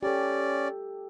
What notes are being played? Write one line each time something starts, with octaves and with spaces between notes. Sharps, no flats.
C#4 G4 A4 D5